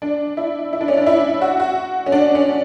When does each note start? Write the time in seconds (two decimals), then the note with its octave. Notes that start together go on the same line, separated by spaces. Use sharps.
0.02 D4
0.37 E4
0.73 E4
0.81 D4
0.88 C#4
0.97 D4
1.07 E4
1.41 F#4
1.60 F#4
2.06 C#4
2.12 D4
2.35 C#4